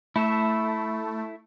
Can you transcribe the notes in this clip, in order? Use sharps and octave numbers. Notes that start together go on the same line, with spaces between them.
A3 E4 A4 E5